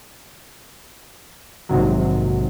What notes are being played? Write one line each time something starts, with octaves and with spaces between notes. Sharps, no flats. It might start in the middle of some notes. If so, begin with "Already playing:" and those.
A#1 G#2 C3 D#3 F#3